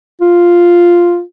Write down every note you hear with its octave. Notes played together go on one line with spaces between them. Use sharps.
F4